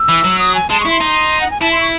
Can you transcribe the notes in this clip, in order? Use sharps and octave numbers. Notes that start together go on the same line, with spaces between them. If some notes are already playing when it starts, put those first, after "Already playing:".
Already playing: E6
E3
F#3
D#6
G#5
G#3 A5
C#6
E4
C6
D#4
F#5
G#5
E4 A5
C6
C#6